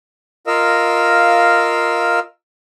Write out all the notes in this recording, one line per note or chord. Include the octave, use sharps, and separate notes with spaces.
F4 A#4 D#5 F5 E6